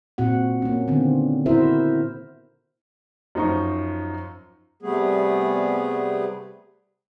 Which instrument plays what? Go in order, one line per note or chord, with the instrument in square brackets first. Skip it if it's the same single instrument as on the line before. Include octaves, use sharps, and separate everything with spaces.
[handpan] A#2 C4 F#4 F#5
A#3 C#4
D3 D#3 B3 C4
E4 F#4 A#4 C5 E5
[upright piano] F#2 F3 D#4 C5 C#6
[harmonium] C3 G3 A3 B3 G#4